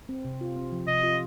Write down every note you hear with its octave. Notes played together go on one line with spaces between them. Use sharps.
C4
C3
F4
C4
F3
C3 D#5
F4